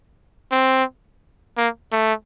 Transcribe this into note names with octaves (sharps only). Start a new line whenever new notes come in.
C4
A#3
A3